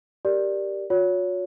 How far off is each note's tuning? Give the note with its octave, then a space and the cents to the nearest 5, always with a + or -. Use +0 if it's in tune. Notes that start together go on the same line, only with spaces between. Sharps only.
G4 +0 A#4 +0 D5 +0
F#4 -45 C#5 +25